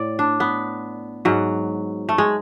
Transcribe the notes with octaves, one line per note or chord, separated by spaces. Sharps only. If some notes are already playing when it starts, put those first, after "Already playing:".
Already playing: A2 D5
D4
B3
G#2 F#3
A3
G#3